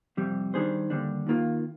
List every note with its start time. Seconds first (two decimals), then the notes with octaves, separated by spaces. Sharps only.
0.17 F2 C3 G3
0.54 D#3 G3 D4 G#4 C5
0.90 D#2 D3 G3 D4
1.27 D#2 D#3 A#3 F4